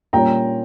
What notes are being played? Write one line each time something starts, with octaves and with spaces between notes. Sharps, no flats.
A#2 G3 C#4 G5 A#5